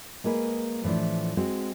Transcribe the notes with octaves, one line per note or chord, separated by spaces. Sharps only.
G#3 A#3 G#4 B4
A2 E3 F3 D4
G#3 C4 F#4